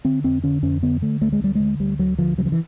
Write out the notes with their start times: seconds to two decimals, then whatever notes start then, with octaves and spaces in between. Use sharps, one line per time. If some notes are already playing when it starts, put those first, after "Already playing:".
0.05 D3 C4
0.24 F2 C4
0.44 D3 C#4
0.63 F2 C#4
0.82 D3 B3
1.02 D3 A3
1.21 D2 A3
1.32 G#3
1.41 D2 G3
1.55 D3 G#3
1.80 D2 G3
1.99 D2 F#3
2.18 D3 F3
2.38 C#3 F#3
2.45 F3
2.52 E3